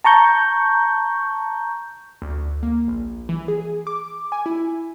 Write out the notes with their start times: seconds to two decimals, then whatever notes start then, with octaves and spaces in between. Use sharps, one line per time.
0.04 A5 A#5 C#6 G6
2.22 D2
2.63 A#3
2.88 A#1
3.29 E3
3.48 G#4
3.87 D6
4.32 G#5
4.46 E4